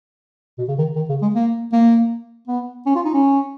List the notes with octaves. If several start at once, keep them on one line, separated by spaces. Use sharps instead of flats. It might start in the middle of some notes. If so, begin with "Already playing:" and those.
B2
C#3
D#3
D#3
C#3
G#3
A#3
A#3
B3
C#4
F4
D#4
C#4